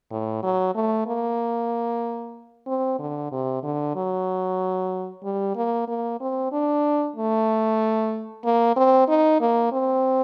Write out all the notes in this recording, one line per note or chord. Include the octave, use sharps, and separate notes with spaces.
A2
F#3
A3
A#3
C4
D3
C3
D3
F#3
G3
A#3
A#3
C4
D4
A3
A#3
C4
D#4
A#3
C4